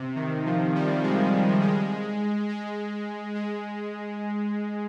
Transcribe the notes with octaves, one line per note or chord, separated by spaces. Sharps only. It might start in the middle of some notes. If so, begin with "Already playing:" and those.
Already playing: C3
D#3
F3
G3
G#3
G#3
G#3
G#3